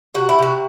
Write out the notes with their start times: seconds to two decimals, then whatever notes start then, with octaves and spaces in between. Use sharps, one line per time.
0.14 C3 F#4
0.29 E4
0.39 C3 F#4